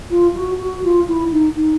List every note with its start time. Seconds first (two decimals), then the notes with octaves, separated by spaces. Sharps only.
0.10 F4
0.35 F#4
0.59 F#4
0.83 F4
1.07 E4
1.32 D#4
1.56 D#4